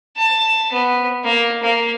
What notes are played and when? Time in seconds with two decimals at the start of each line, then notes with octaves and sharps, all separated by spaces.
0.17 A5
0.72 B3
1.24 A#3
1.63 A#3